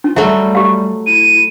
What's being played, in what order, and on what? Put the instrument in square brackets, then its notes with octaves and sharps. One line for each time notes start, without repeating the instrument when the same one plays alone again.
[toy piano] C#4 [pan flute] F4
[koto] F#3 A3 [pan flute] G3 [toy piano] E5
[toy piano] G4 F5
[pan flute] E4 [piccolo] D#7